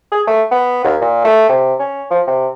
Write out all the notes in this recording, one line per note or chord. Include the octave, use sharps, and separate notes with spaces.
G#4
A3
B3
D#2
A#2
A3
C3
C#4
F3
C3